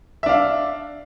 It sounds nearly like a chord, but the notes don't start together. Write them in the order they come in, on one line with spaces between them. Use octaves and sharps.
E5 D4 F5